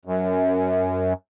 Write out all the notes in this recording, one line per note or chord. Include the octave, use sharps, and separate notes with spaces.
F#2